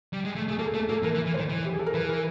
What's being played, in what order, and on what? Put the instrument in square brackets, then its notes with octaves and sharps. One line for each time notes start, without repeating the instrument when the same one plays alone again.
[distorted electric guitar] G3
G#3
A3
[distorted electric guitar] A3 [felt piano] G#4
[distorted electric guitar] A#3 [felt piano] A4
[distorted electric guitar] A3 [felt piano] A4
[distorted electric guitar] A#3 [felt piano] A4
[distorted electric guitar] E3 [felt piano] A#4
[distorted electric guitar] E3
E3
[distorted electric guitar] D#3 [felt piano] C5
[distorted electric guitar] E3
[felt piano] G4
G#4
A4
A#4
[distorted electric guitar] E3 [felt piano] B4
[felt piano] A#4